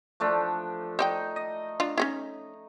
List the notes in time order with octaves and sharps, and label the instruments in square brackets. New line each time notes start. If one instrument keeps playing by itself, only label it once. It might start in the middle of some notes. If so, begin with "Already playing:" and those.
[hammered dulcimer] F3 A3 D4
[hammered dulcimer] D#4 [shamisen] C5 D5 G5
[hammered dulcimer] D#5
[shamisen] D4 F4
C#4 D#4 E4